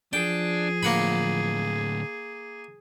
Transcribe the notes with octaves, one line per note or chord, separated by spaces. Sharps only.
F3 D4 G#4 G5
A2 D3 A#3 F#5 B5